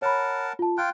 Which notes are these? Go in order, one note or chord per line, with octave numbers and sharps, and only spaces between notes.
A#4 C#5 F#5 A5 B5
F4 A5
F4 G5 F#6